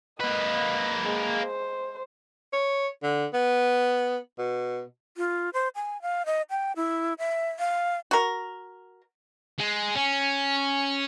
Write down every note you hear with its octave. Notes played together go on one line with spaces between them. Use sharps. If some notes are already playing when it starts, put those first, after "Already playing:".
A#3 B4 D#5
G#3
C5
C#5
D3
B3
B2
F4
C5
G#5
F5
D#5
G5
E4
E5
F5
F#4 A#4
G#3
C#4